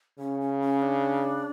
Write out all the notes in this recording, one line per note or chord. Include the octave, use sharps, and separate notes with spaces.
C#3 C#4
C#4
C#4
D4